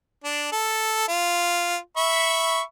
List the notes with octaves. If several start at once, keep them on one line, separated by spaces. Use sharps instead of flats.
D4
A4
F4
E5 B5 C#6